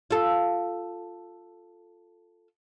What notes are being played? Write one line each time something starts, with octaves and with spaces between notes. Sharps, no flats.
F4 A4